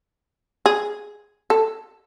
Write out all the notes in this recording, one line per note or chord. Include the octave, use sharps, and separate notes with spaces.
G#4
A4